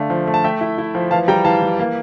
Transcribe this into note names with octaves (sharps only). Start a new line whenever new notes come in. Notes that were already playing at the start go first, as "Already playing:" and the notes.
Already playing: D3 A3 D5 F5
F3
A3
A5
A3 E5 G5
E4
E4
F3
E3 F5 A5
G3 G5 A#5
E3 F5 A5
E3
A#3